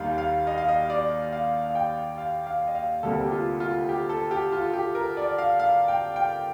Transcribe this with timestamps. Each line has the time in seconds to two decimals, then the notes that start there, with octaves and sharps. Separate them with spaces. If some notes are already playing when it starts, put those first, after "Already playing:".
Already playing: D#2 D#3 G3 F5
0.18 F5
0.47 D#5
0.58 F5
0.68 D#5
0.90 D5
1.33 F5
1.66 F5
1.75 G5
2.18 F5
2.47 F5
2.67 D#5
2.75 F5
3.03 D2 C3 G3 A#3 A4
3.24 G4
3.32 F4
3.60 F4
3.89 G4
4.09 A4
4.31 G4
4.52 F4
4.73 G4
4.95 A#4
5.17 D5
5.38 F5
5.59 F5
5.88 G5
6.16 G5